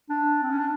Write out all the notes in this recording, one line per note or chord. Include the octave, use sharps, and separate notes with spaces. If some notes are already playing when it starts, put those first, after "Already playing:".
D4
C4
C#4
D4